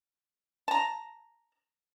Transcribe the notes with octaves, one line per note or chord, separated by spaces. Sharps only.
A5 A#5